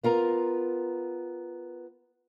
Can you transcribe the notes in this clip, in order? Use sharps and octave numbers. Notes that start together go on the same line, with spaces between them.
B3 F4 A#4 A#5